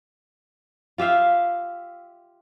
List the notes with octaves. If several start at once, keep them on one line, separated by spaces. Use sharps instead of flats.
F4 G4 E5 F5